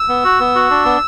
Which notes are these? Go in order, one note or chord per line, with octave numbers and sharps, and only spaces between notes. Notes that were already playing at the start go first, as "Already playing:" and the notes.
Already playing: E6
B3
F#4
B3
F#4
D4
B3